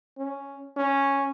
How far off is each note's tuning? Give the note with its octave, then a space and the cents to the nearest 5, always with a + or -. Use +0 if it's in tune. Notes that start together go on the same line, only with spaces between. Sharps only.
C#4 +0
C#4 -5